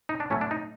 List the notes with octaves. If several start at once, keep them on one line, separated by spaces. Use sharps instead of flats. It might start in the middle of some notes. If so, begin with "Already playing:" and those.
D#4
D4
A2 F#3 A3 C#4
D4
D#4